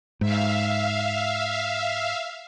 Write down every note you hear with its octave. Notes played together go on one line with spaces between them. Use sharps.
G#2 E5 F5